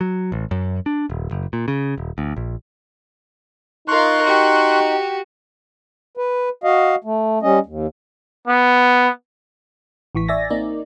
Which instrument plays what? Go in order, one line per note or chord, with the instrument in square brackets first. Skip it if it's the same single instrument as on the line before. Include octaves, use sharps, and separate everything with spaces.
[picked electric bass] F#3
A1
F#2
D4
D#1
F#1
A#2
C#3
D#1
D2
A#1
[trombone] D#4 [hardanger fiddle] F4 A#4 [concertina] C6 C#6 F#6
[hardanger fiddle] F#4 [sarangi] G4
[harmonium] B4
F#4 D#5 F5
A3
G3 C#4 D#5
D#2
[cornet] B3
[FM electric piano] A1 E3 C#6 B6
D5 E5 G#5 A6 A#6
A#3 C4 D#4 D5